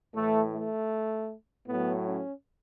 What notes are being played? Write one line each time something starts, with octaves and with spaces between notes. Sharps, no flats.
A2 E3 A3
A3
A2 F#3 B3
C#4